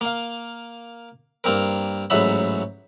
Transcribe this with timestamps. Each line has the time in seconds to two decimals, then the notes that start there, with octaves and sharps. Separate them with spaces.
0.01 A#3 F5
1.44 G2 A#3 C4 A#4
2.10 A1 G#2 F#3 F#4 E5 B5